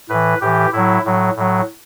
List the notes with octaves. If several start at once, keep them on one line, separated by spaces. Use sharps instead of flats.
A2 E3 B4
A2 E3 G4
A2 F#3 E4
A2 F#3
A2 F#3